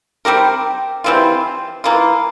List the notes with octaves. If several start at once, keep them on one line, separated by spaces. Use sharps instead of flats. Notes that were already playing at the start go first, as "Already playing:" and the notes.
G3 C4 G4 A#4
E3 G3 C4 F4
E3 A#3 F4